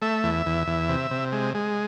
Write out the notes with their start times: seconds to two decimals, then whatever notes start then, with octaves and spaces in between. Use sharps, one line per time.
0.02 A3 E5
0.24 E2
0.46 E2
0.67 E2
0.89 C3
1.11 C3
1.32 G#3
1.54 G#3